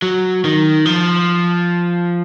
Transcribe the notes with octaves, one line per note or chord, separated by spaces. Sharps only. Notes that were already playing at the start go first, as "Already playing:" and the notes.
F#3
D#3
F3